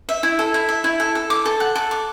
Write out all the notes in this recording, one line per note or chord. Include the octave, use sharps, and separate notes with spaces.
E5
E4
A4
E4
E5
E4
A4
A4
D6
A4
F#5
A4
D6